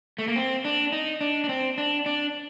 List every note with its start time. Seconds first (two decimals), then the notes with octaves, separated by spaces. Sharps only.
0.18 A3
0.28 A#3
0.36 C4
0.65 D4
0.92 D#4
1.21 D4
1.44 D4
1.49 C4
1.78 D4
2.06 D4